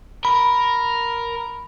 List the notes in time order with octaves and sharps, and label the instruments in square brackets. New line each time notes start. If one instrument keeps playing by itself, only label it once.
[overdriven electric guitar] A#4 [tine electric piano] B5